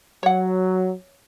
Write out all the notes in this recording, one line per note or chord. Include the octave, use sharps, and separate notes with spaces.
F#3 C#5 F#5